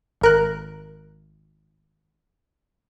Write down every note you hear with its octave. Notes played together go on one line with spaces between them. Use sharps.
G#1 A#4 F#6